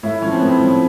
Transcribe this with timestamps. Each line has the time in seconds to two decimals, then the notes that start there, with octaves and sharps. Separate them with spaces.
0.03 A2 E4
0.22 F3 C#4
0.32 C4
0.39 A2 B3
0.48 C4
0.60 F3